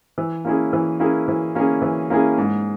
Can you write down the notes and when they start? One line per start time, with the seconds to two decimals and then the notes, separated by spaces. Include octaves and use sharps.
0.18 E3
0.45 A#3 C#4 E4 G#4
0.73 E3
1.00 A#3 C#4 E4 G#4
1.28 E3
1.55 A#3 C#4 E4 G#4
1.82 E3
2.10 A#3 C#4 E4 G#4
2.38 G#2